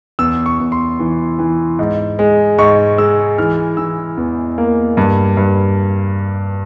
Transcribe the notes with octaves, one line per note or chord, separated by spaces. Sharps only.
E2 E6
C#6
E2
C6
E3
E3
G#2
G#3
G#2 C#6
G#3 E6
E3 F6
E3 E6
E2
A#3
G2
G2